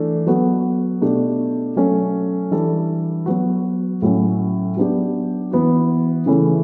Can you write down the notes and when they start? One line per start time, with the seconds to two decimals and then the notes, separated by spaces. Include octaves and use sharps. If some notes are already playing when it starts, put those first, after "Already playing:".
Already playing: E3 A3 D4
0.27 F#3 B3 F#4 A4
1.01 B2 A3 D4 G4
1.76 F#3 A3 C#4
2.51 E3 G3 D4 A4
3.26 F#3 B3 F#4
4.02 A2 F#3 C#4
4.77 F#3 B3 D4 G4
5.51 E3 B3 F#4
6.26 C#3 E3 A3 C#4 E4